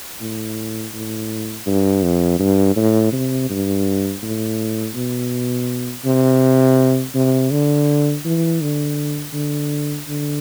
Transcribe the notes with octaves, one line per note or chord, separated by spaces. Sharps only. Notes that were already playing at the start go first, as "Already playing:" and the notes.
A2
A2
G2
F2
G2
A2
C3
G2
A2
B2
C3
C3
D3
E3
D3
D3
D3